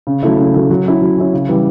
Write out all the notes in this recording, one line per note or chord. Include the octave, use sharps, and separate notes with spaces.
C#3
F#3 A3 E4
C#3
F#3 A3 E4
F#3
C#4 E4
F#3
C#4 E4
C#3
E3 G3